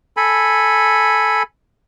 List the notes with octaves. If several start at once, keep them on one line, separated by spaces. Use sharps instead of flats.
A4 G#5 B5